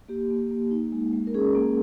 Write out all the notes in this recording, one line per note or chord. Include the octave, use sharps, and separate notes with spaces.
A#3 G4
A#3
A#3
D#4
G#3
G#3
A#4
C#4 G#4
A#3